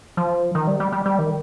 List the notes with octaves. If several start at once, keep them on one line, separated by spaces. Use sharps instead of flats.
F3
D#3
G3
G3
G3
G3
D#3